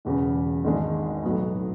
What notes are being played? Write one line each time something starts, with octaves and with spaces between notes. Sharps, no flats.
E1 E2 C#3
G#1 G#2 G#3 D4
B1 A2 F#3 B3